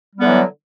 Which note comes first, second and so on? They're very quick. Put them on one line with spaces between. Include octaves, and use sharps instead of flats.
G3 B3 D3 E3 F#3